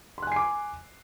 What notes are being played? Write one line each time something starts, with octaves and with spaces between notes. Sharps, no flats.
G#5 C6 D6 F#6 C7